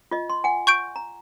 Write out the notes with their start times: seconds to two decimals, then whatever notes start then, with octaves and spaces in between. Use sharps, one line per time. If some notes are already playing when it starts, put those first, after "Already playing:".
0.11 F4 D#5
0.30 C6
0.44 F#5 G#5
0.67 C#6 G6 D7
0.96 A#5